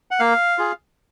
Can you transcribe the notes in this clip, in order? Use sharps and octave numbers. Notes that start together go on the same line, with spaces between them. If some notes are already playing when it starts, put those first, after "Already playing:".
F#5
A#3 F5
F4 G#4